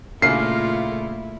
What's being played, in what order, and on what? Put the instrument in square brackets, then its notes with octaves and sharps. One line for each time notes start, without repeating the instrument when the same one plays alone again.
[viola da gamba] A#2 A3 F4 [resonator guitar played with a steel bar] C#3 A#3 [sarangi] E4 [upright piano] C7